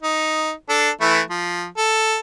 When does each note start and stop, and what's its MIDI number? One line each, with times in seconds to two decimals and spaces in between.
0.03 0.52 63
0.69 0.90 62
0.69 0.90 69
1.01 1.21 52
1.01 1.21 57
1.01 1.21 64
1.30 1.66 53
1.77 2.18 69